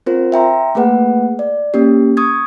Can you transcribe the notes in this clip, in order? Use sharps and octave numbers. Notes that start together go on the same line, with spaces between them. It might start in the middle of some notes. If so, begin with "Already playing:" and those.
C4 F4 A#4 C5
E5 G5 A#5 C6
A3 A#3 G#4 B4 F#5
D5
A#3 C#4 G4
C#6 D#6 G#6